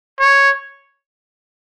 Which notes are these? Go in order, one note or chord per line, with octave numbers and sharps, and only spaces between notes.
C#5